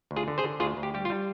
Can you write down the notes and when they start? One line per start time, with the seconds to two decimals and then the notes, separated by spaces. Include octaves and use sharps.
0.11 D2
0.16 F4 G#4
0.28 D3
0.38 G#4 C5
0.44 D3
0.60 D2 F4 G#4
0.77 D2
0.83 G4
0.94 G3 G4
1.05 F4
1.10 G3